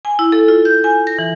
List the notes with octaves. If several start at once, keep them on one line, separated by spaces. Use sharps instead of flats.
G#5
E4
A4
F4
G6
G#5
A#6
E3